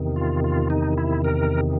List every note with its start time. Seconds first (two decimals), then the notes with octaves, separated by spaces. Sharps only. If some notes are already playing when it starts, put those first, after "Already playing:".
Already playing: E2 C3 D#3
0.16 F4
0.44 F4
0.70 D#4
0.98 E4
1.24 A#4